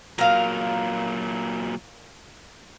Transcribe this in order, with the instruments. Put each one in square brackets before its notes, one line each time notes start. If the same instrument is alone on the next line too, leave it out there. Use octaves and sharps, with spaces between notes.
[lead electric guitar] A#2 F#3 [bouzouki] A#4 F5